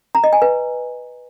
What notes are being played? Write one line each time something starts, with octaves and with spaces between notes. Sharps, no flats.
A#5
D#5
G#5
B4